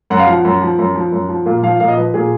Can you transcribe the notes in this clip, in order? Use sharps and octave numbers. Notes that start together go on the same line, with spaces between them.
F#2 F#5
F5
F3 F#5
F#2
F3
F#2
F3
F#2
F3
A#2 F5
F3 F5
A#2 F5
D#5
F3 B4
A#2 G#4